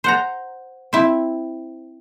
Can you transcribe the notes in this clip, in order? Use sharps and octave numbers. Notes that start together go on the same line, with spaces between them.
C5 F#5 A#5
C4 E4